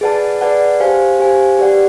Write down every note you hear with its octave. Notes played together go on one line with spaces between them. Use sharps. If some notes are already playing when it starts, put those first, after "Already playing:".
G#4 B4 D5 F#5 A5
G#4 B4 D5 F#5 A5
G4 C5 F5 G#5
G4 C5 F5 G#5
G4 B4 D5 F#5